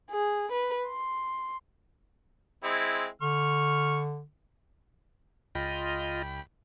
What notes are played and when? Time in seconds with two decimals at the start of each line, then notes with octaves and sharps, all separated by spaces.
0.10 G#4
0.52 B4
0.87 C6
2.64 G#3 C4 E4
3.22 D3 C#6 F6
5.55 C#2 F4 D#5 G5 B5